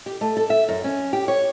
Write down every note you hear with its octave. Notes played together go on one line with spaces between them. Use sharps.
G4
A3
A4
E5
F#2
C#4
G4
C#5